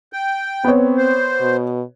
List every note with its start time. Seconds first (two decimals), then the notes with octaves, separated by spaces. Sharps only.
0.13 G5
0.64 B3 C4 C#5
0.97 C5
1.41 B2